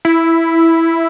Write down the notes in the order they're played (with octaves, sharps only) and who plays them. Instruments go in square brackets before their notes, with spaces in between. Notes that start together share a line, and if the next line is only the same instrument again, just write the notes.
[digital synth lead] E4